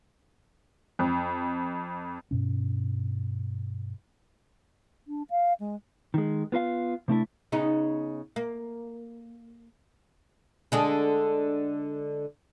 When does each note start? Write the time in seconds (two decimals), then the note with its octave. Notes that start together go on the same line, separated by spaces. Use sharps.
0.99 F2
2.31 G2 B2 C#4
5.07 D4
5.30 F5
5.60 G#3
6.14 D#3 G#3
6.52 B3 F4 B4 F5
7.08 C3 A3 D4 E4
7.52 C#3 B3 D#4
8.36 A#3
10.72 D3 G#3 D4